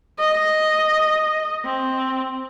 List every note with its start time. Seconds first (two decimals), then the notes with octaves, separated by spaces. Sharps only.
0.19 D#5
1.65 C4